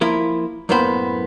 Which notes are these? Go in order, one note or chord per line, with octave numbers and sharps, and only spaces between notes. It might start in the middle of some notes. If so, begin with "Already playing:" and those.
F3 A#3 E4 F4
F#2 A2 A#3 B3 C5 B5